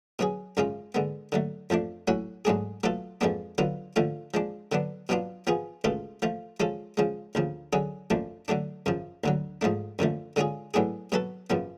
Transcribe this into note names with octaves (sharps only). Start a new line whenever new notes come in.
B2 F#3 C#4 G#4
F#2 C#3 G#3 C#4 F4
D3 G#3 B3
D3 F#3 A3
F2 F3 A3 D4
A2 F#3 C#4 F#4
G#2 F#3 A3 D4 G#4
B2 F#3 A3 F4 A4
F2 F3 G#3 B3 D4
D3 F#3 B3 F4
D3 F3 A3 F4
F3 G#3 D4
D3 F#3 B3 D4
B2 F#3 B3 D4 F4
F3 B3 F4 G#4
C#2 B2 A3 F4 A4
F3 A3 F4
F3 G#3 C#4 F4 A4
C#3 F3 G#3
D2 C#3 F3
D3 F#3 C#4 G#4
F#2 F3 A3 D4
D3 F#3 A3 D4
F#2 C#3 F3
D2 D3 F#3
G#2 F3 A3 D4
F#2 D3 F3 A3
D3 G#3 C#4 F4 G#4
A2 F#3 B3 D4 G#4
B2 F#3 B3 F#4 A4
F#2 C#3 F3 B3